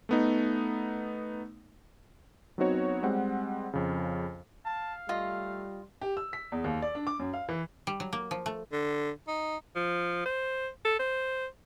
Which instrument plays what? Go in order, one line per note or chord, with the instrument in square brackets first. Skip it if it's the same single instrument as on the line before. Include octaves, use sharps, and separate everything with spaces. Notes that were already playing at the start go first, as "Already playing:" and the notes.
[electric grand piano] A3 B3 D#4
F#3 B3 C4 D#4 F#4 C#5
G3 G#3 C4 F#5
F2 C#3
[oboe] F5 [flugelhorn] A5
[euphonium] G3 [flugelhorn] A3 [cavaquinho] F4 D#5
[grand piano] G4
E6
B6
E2
D#2
D5
D4
D6
F#2
F5
E3
[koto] G3
F#3
A#3
F3
A3
[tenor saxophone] D3
D#4
[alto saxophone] F3
C5
A4
C5